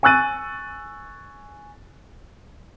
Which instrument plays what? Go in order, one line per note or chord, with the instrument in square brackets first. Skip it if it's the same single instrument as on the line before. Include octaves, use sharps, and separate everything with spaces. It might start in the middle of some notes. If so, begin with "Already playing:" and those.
[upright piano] G#5 C#6 E6 F#6 A6 D#7